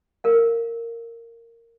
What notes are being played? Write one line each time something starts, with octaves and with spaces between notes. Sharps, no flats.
A#4 F5